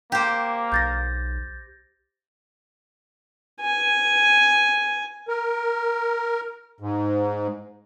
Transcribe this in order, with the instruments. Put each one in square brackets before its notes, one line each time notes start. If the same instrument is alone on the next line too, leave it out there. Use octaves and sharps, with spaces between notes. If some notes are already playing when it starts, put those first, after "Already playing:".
[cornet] A#3 [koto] G4 C5
[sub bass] B1 [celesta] G6 A6 A#6
[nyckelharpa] G#5
[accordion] A#4
G#2